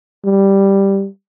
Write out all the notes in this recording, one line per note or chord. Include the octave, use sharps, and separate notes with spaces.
G3